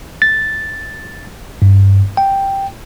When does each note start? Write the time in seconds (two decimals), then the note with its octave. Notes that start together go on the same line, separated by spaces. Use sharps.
0.22 A6
1.62 G2
2.17 G5